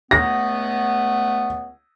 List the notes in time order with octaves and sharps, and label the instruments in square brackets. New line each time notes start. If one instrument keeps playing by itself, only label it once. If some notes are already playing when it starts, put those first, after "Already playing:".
[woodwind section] C#2 A3 B3 [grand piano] A#6